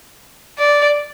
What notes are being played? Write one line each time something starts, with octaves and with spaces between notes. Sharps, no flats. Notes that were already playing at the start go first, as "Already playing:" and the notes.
D5